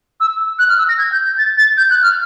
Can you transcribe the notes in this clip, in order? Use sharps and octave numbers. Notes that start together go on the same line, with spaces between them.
E6
F#6
F6
E6
A#6
G#6
G6
G6
A6
A6
G6
F#6
F6